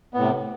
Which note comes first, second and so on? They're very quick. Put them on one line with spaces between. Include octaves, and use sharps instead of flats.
B3 A2 C3